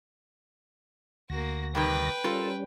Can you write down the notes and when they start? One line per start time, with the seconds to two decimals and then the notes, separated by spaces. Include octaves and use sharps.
1.30 D2 A#3 F#4 A#6
1.75 C3 D#3 G3 B4 G5
2.24 G3 C#4 F4 A4 A#4